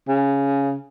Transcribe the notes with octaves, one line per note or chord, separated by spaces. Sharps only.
C#3